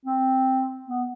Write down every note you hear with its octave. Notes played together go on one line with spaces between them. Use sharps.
C4
B3